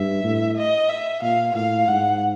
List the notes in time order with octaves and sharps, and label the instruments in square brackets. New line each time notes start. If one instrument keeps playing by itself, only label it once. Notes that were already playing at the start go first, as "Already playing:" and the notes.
Already playing: [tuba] G2 [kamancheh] E5
[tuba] A2
[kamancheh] D#5
E5
[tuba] A#2 [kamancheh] F5
[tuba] A2 [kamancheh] F5
[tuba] G#2 [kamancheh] F#5